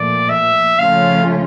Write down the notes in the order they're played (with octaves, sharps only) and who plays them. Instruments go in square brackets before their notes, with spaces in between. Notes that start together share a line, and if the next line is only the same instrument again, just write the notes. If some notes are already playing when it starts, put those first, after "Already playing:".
Already playing: [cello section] A#2 F3 A3 [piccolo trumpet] D5
[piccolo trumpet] E5
[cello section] C#3 F3 A3 C#4 F4 [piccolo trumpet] F5